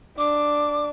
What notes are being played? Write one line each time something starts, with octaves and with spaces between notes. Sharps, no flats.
D4 D6